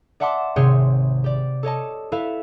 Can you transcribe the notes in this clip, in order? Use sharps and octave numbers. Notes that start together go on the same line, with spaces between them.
D5 E5 F#5 A5 C6 D6
G#1 C3 G#4 C5 C#5
G4 D5
A4 C#5 D#5 A5
E4 A4 B4 E5 F5